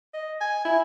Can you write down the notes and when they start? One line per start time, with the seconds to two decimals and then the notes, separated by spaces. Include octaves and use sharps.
0.14 D#5
0.40 G#5
0.65 E4